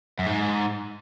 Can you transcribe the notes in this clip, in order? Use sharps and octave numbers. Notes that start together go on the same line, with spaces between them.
F#2
G#2